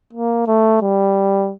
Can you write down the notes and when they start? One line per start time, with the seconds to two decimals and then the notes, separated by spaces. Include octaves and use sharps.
0.13 A#3
0.47 A3
0.81 G3